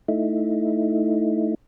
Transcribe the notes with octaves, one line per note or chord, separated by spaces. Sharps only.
A3 D#4 E4